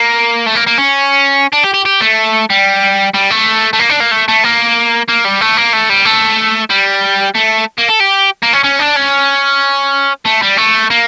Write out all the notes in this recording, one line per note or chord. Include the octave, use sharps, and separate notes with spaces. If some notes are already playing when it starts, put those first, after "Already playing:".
Already playing: A#3
A3
A#3
A#3
C#4
D4
G4
G4
G4
A3
G3
G3
A3
A3
A#3
D4
A#3
A3
A3
A#3
A#3
G3
A3
A#3
A3
G3
A3
G3
A3
A#3
A4
G4
A#3
C#4
C#4
D4
C#4
A3
G3
A3
A#3